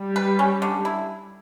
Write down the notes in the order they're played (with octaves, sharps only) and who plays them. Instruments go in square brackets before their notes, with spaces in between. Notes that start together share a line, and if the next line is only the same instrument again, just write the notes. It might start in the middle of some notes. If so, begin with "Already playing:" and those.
Already playing: [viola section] G3
[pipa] B4
C#4
D3
E4